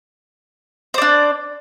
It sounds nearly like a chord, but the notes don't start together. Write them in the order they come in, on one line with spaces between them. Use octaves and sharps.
C5 D5 D4